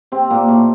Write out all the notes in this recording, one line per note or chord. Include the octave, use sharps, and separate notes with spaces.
C3 C4
A#2 A#3
A2 A3